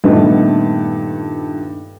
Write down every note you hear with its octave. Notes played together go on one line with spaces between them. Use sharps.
G2 A#2 D#3 A3 B3 D#4